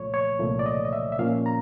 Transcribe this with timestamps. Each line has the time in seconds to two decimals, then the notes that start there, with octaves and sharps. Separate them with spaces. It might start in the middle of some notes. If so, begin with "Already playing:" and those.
Already playing: C2 A#2 F3 A3 C#5
0.14 C#5
0.39 C2 A#2 F3 A3
0.59 D5
0.66 D#5
0.85 D#5
0.93 E5
1.12 E5
1.19 A#2 F3 A#3 C#4 F5
1.46 A#5